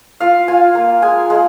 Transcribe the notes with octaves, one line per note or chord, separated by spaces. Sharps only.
F4 F5
F4 G#5
A#3
G#3 G#5
G#3